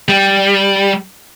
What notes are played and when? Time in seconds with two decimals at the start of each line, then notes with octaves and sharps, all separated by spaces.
0.09 G3